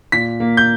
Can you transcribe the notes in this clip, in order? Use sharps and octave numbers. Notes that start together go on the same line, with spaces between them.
A#2 B6
A#3
G6